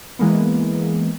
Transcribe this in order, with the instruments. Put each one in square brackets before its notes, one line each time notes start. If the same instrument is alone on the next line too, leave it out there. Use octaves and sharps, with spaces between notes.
[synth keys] E3 G#3 A#3 B3